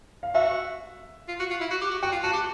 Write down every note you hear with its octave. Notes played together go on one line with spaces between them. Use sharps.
F5
F#4 E5
F4
F#4
F4
E4
F#4
G4
F#4
F#4 G5
F4
F#4 A5
G4